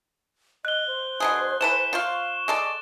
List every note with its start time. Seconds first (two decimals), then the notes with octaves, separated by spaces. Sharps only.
0.65 D#5 F#6 G7
0.87 C5
1.20 B2 D3 G#4
1.61 E3 A3 B4 E7
1.93 F4 C5 F5 C#6
2.48 G#3 A4 D5